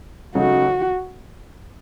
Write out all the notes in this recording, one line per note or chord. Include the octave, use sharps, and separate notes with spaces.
C#3 F#3 A3 D#4 F#4